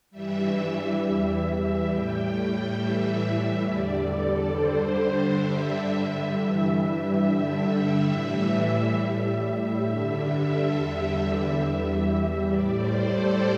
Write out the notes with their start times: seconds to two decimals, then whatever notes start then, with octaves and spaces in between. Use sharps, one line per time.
0.11 G2 E3 G3 E5
1.00 E2 E3 G3
1.88 A2 G3 G5
2.76 A2 E3 G3 E5
3.64 E2 D3 G3 D5
4.08 A4
4.53 G2 D3 G3 C5
5.41 G2 D3 G3 E5
6.29 G2 E3 G3
7.18 G2 D3 G3 E5
8.06 A2 E3 G3
8.94 A2 G3 E5
9.82 G2 D3 G3
10.71 E2 D3 G3
11.59 E2 E3 G3
12.47 A2 G3 D5
12.77 C5
13.07 A4